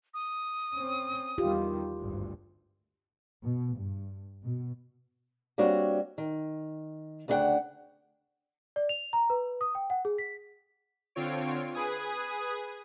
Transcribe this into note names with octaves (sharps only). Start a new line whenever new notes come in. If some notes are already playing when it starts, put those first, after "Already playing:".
D#6
C4 C#4
E2 D#3 G3 F4 G4
G#1 D2 G2
B2
G2
B2
G3 A#3 C4 D4 F#4 C#5
D#3
D2 C#3 D4 F#4 F#5 G5
D5
F7
A#5
B4
D#6
G5
F#5
G#4
B6
D3 C4 F4 C#5 D7
G#4 B4 G#5 D#6